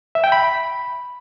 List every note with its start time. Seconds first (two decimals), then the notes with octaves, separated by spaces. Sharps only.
0.15 E5
0.24 G5
0.32 B5